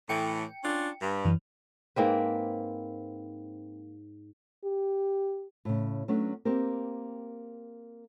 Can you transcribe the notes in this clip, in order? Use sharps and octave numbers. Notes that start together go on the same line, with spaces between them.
A2 E3 G5 C#7
C#4 D4 F4
G2
F#2 E3
G#2 A#3 C4 B4
G4
A2 C#3
F#3 A3 B3 C#4 D4
A#3 C4 G4 A#4